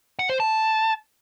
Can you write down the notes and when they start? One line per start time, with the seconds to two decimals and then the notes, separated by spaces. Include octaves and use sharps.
0.19 F#5
0.30 C5
0.40 A5